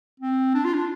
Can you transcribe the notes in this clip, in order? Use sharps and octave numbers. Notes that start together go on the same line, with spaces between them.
C4
D4
F4
D4